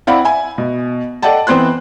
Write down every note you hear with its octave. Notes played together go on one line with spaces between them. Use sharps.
C4 E4 D5 F5 F#5 B5
E5 G#5
B2
A4 D5 D#5 F#5 G5 A5
E3 B3 C4 C5 C6 F#6